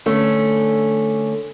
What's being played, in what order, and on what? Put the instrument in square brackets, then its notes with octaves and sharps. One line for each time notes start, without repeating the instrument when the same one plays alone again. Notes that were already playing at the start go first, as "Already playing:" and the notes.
[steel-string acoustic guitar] D3 A3 C#4